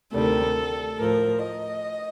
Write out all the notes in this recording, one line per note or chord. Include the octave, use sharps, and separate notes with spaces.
D2 C3 D#3 G3 A4
A2 F3 A#4
D#5